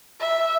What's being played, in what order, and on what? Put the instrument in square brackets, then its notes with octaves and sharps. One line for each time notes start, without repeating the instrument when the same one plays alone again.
[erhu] E5